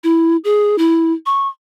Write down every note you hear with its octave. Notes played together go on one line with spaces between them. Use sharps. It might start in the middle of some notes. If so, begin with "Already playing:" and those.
E4
G#4
E4
C#6